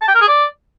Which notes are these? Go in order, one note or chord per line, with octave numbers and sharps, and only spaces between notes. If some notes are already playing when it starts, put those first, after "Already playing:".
A5
G5
A#4
G#4
D5